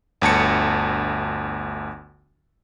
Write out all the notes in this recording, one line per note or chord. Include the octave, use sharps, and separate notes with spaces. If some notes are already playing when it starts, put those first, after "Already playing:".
G1 D2 A5 C#7